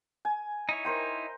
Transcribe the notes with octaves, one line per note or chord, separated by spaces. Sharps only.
G#5
D#4 E4 C#5
A#4 C5 G5